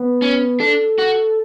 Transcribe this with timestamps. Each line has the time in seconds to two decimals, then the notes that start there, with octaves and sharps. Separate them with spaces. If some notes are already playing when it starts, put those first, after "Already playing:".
Already playing: B3
0.22 C#4
0.60 D4 A4
0.98 F#4